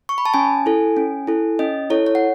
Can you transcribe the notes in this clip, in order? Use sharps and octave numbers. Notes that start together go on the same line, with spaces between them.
C#6
B5
A5
C#4 G#5
E4 A4
C#4
E4 A4
C#4 D#5
E4 A4 C#5
C#5
F#5